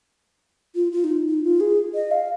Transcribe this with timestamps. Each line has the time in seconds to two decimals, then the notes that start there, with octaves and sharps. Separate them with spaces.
0.75 F4
0.92 F4
1.04 D#4
1.29 D#4
1.44 F4
1.60 G#4
1.95 D#5
2.11 F5